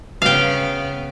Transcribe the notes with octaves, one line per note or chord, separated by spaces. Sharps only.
C#3 B3 F5 G5